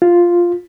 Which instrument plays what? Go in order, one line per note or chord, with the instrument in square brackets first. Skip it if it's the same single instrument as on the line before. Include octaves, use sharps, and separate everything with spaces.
[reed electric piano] F4